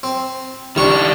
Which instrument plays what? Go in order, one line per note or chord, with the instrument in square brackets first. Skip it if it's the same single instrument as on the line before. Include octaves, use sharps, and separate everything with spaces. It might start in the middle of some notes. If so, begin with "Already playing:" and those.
[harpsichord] C4
[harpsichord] C2 C#6 [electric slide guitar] D#3 D4